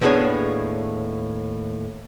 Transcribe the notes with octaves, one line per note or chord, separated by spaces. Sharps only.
D#2 A2 B3 D4 G#4 C#5